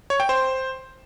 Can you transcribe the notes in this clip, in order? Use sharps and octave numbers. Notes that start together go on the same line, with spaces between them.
C#5
G5
C5